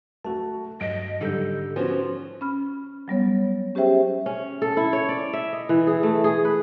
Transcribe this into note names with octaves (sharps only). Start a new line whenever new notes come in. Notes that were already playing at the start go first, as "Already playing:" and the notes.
A3 F#4 A4 A5
G2 F#3 D#5 D7
G#2 D3 D#3 G3 A4 G6
F3 B3 C#4 F#4
C#4 B5 F6
F#3 G3 B3 C#5
C#4 G4 G#4 C5 E5 G5
C#4
A4
E4
C#5
D5
E5
D#5
E3
G#4
A3
G#4
B4